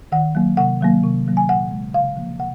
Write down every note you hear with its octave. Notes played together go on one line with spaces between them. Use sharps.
D#3 F#5
F#3 A#3
C3 F#5
D#3 F#3 A#3
C3
D#3 F#3 A#3
G#5
A#2 F#5
G#3
C#3 F5
F3 A#3
C3 F#5